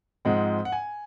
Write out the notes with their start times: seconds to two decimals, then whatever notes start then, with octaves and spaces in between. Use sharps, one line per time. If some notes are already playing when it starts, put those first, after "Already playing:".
0.25 G#2 F3 G#3 C4 F#5
0.65 F#5
0.72 G#5